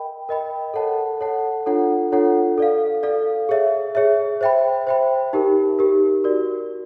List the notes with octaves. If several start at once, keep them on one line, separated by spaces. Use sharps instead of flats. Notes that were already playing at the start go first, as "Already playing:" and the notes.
Already playing: A#4 D#5 G5 B5
A#4 D#5 G5 B5
A4 C#5 F#5 A5
A4 C#5 F#5 A5
D4 F4 A4 C#5 F#5
D4 F4 A4 C#5 F#5
A4 D5 F5
A4 D5 F5
G#4 C#5 E5
G#4 C#5 E5
C5 E5 G5 B5
C5 E5 G5 B5
D#4 G4 A#4
D#4 G4 A#4
F#4 A#4 D5